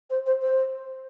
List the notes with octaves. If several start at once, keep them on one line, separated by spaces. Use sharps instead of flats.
C5
C5
C5